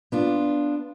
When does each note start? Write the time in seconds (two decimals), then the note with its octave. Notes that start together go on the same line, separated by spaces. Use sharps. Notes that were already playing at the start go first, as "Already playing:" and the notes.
0.12 B3 D4 F4